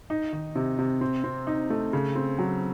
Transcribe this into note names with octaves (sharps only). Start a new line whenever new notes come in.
D#4
D#3
C3
C3
C4
C4
D#4
A3
C#3
C4
F#3